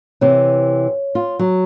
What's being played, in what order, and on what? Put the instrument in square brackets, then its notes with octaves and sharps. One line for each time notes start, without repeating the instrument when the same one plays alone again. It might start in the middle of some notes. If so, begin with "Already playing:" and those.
[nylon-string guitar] C3 E3 [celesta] C#5
[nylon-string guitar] F4
F#3